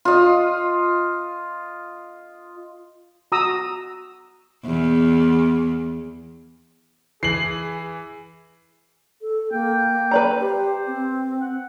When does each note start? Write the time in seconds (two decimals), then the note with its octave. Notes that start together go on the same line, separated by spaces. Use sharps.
0.05 F4 D#5
3.32 F#4 A#5 D#6 E6
4.65 E2
7.23 E3 G#4 C7 F#7
9.21 A4
9.52 A#3 G5
10.11 B4 D5 A#5
10.40 G4 C5
10.87 C4
11.41 F#5